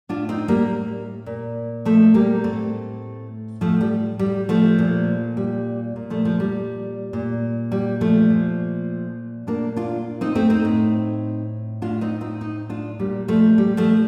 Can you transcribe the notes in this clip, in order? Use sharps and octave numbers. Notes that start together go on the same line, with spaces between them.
A2 D4 F4
C4 D#4
G3 A#3
A#2
F3 A3
G3 A#3
A2 A3 C4
A2 F3 A3
G3
G3
F3 A3
A#2
G3
A#2
F3 A3
F3
G3
A#2
G3
F3 A3
A#2
A#2 A#3 D4
D4 F4
C4 D#4
A3 C4
C4 D#4
A2
A2 D4 F4
C4 D#4
C4 D#4
C4 D#4
D4 F4
A#2 G3
F3 A3
G3
F3 A3